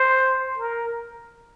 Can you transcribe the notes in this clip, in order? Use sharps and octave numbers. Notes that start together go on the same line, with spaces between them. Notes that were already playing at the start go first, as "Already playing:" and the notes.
Already playing: C5
A#4